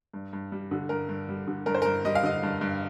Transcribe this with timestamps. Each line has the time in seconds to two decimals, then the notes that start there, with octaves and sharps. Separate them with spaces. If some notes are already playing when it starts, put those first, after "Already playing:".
0.14 G2
0.33 G2
0.52 G3
0.71 D3
0.89 G2 A#4
1.09 G2
1.29 G3
1.47 D3
1.66 G2 A#4
1.75 C5
1.82 G2 A#4
2.05 G3 D#5
2.15 F5
2.23 D3 D#5
2.43 G2
2.61 G2